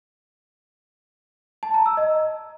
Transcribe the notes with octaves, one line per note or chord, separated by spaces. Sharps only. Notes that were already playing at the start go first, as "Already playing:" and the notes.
A5
A#5
E6
D#5